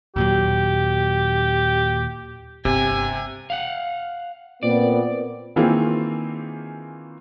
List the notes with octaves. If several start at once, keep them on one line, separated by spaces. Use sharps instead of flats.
D#2 A#2 F#3 G4
G1 C3 G#5
F5 F#5
A#2 B3 C4 D5
D#3 E3 A#3 C4 F4 G#4